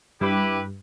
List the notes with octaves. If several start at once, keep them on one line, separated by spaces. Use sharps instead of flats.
G2 E4 G4 B4